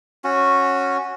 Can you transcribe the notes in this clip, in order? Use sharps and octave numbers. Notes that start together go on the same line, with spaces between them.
C#4 F#4